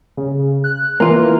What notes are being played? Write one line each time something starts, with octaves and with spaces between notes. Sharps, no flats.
C#3
F#6
E3 A#3 F4